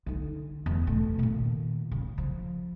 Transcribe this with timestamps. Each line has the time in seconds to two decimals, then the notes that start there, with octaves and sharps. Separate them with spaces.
0.06 D3 D#4
0.66 E2
0.87 B2 A3
1.19 A#2 D#3
1.91 C#3
2.18 F3